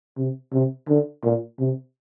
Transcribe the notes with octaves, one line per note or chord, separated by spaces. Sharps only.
C3
C3
D3
A#2
C3